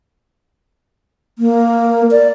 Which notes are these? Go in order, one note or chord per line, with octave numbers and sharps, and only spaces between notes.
A#3
D5